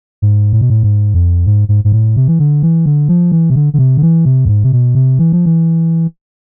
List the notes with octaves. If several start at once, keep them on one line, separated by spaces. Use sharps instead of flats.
G#2
A2
B2
A2
G#2
F2
G#2
G#2
G#2
A2
C3
E3
D3
E3
D3
F3
E3
C3
D3
D3
C3
D3
E3
C3
F2
G#2
C3
B2
C3
E3
F3
E3